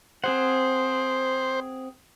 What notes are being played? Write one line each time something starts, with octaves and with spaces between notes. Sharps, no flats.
C4 G#4 C5 F#5